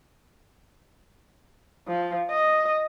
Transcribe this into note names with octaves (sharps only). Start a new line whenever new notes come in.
F3
D#5